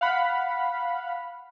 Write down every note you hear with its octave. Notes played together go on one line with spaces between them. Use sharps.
F5 F#5 B5